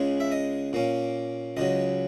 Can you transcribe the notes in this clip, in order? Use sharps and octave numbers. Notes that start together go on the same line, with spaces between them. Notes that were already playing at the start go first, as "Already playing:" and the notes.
Already playing: C#2 C#3 G#3
E5
D#5
A#2 A#3 C#4
C#2 C#3 F#3 D#5